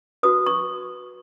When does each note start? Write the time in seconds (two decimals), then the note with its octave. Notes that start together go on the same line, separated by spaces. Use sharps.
0.23 F#4 B4 D#6
0.46 C#6